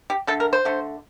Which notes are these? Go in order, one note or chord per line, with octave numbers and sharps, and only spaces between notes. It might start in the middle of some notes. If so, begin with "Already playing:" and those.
G4
D3 A3 A4
A#4
C5
D3 A3